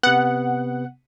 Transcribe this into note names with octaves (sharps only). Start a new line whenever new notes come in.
C3 B3 F#5